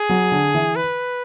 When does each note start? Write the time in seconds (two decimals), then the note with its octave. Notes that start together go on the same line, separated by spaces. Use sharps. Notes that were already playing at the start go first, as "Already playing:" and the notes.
Already playing: G#4
0.09 F#3
0.32 D3
0.55 E3
0.76 B4